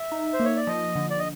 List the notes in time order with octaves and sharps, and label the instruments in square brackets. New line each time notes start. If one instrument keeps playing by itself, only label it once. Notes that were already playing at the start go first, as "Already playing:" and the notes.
Already playing: [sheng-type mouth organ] E5
[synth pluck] D#4
[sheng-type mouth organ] C5
[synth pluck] A#3
[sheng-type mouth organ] C#5
D5
[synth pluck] F3 [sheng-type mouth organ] D#5
[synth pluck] D3
[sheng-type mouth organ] D5
D#5